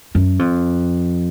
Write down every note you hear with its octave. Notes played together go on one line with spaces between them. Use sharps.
F#2
F2